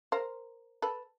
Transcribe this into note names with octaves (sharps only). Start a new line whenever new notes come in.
A#4 C5
A4 B4